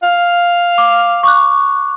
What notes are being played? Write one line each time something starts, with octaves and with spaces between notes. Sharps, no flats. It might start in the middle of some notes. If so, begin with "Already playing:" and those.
F5
D6
C#6 D6 F#6